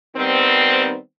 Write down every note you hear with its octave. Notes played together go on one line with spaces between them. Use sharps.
D#3 G3 B3 C4